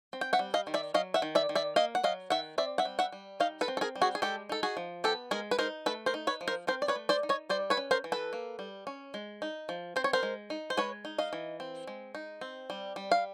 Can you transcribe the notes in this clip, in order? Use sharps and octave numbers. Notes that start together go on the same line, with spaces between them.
C4
G5
E5 F#5
G3
D#5 F5
D#3
D5 E5
F#3 D#5 F5
E5 F#5
D#3
D5 E5
D#3
D5 E5
A#3 D#5 F5
F#5
F#3 D#5 F5
D#3 E5 F#5
C4 D5 E5
E5 F#5
G3
E5 F#5
G3
D#4 D#5 F5
A4 B4
C4
A4
G#4 A#4
G3
F#4 G#4
G#4
G#3 G4 A4
D#4 A4
F#4 G#4
F3
B3 G4 A4
G#3 G#4 A#4
B4
D#4 A#4 C5
A3 A4 B4
A#4 C5
D#4
B4 C#5
F3
A#4 C5
C4 A#4 C5
D5
B4 C#5
A3
C5 D5
D#4
C#5 D#5
G3 C5 D5
B4 C#5
C#4
A#4 C5
E3
A4 B4
A#3
G3
C#4
G#3
D#4
F3
C4 C5
C#5
A#4 C5
G#3
D#4
C5
G#3 B4 C#5
D#4
D#5 F5
E3
C4
G#3
D#4
C4
G3
G3
F5